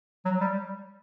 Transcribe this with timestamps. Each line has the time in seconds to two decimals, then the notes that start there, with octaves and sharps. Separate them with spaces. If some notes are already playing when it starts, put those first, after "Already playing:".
0.25 F#3
0.41 G3